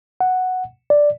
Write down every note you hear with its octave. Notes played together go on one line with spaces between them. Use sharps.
F#5
D5